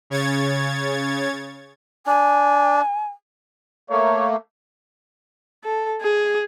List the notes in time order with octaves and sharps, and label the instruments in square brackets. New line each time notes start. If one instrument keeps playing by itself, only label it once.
[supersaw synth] C#3 C#5 G#6 A6
[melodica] D4 [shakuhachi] G#5
[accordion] A3 A#3 [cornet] C#5
[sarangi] A4
G#4